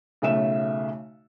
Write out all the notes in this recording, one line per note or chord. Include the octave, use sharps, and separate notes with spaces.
B1 C#3 A3 E5 E7